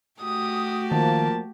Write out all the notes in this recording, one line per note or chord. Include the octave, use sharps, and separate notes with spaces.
A3 F#4 G4 D#6
D#3 F3 A#3 A5